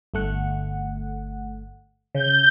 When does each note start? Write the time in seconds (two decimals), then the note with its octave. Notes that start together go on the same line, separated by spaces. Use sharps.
0.14 G1 A3 F#5
2.15 C#3 G6